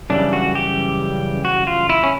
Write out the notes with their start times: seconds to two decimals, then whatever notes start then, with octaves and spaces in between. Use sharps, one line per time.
0.10 F#2 C#3 E3 G3 D4
0.33 F#4
0.55 G4
1.45 F#4
1.67 F4
1.89 E4
2.03 C#4